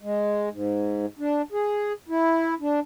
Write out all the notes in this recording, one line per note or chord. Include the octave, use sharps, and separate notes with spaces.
G#3
G#2
D4
G#4
E4
D4